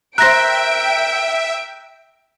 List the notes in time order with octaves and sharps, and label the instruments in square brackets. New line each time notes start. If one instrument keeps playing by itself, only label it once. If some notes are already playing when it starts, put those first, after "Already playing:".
[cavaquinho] A#4 C5 [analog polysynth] E5 [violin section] G5 D7 [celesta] F#6 A#6